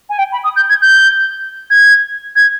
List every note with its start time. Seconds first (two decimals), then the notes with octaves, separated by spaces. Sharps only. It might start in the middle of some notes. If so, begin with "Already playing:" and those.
0.09 G#5
0.18 G5
0.32 B5
0.43 D#6
0.56 G6
0.69 G#6
0.81 G6
1.70 G#6
2.35 G#6